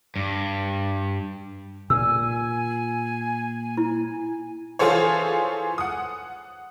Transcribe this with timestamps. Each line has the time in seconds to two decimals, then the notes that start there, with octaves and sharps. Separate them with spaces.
0.16 G2
1.90 A#2 G#5 E6
3.77 E4
4.79 E3 F4 G#4 A4 C5 C#5
5.78 F#5 D#6